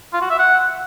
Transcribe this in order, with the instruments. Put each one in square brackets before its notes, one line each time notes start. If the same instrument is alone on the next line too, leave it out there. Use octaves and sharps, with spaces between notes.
[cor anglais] F4
F#4
E5
F#5